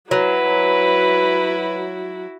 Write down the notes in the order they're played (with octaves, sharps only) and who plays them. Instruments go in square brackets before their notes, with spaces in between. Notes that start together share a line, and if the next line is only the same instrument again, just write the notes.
[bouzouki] F#3 [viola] E4 F#4 [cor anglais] B4